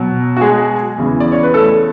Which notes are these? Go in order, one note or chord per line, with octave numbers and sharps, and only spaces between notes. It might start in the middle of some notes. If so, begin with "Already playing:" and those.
Already playing: B2 F#3
F#4
G#3 G#4
E2 C#3 E3
D5
C#5
B4
A3 A4